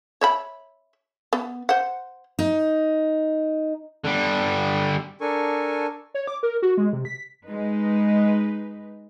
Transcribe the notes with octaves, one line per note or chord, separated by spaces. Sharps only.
C#5 E5 B5
B3
C5 F#5
D#4
D3 G3
D4 A4 A#4 G#5 C#6
C#5
D6
A#4
F#4
G#3
C3
B6
G#3 D#4 B4